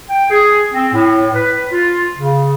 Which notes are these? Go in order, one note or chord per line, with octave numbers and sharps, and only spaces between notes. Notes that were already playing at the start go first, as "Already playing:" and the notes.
G5
G#4
C4
A2
B4
F4
C#3